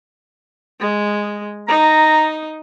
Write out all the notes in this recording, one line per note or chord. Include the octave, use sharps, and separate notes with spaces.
G#3
D#4 A#5